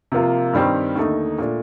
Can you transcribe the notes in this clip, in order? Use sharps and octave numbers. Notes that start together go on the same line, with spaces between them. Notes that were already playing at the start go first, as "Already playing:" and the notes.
C3 F3 A#3 F4
G2 D#3 G3 C4 G4
D#2 D3 A3 D#4
A#2 A3 D4